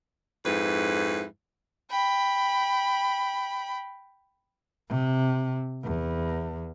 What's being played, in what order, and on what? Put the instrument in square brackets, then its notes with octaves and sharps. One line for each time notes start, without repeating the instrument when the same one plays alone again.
[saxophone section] F2 G#2 E4 B4
[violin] G5 B5
[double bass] C3
E2